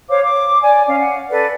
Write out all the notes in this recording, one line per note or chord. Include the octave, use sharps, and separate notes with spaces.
C5 C#5 F5 D6
D6
D5 G#5
C#4 F5
F#5
A4 B4 D5